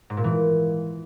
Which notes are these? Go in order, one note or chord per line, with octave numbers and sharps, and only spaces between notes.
G#2
A#2
E3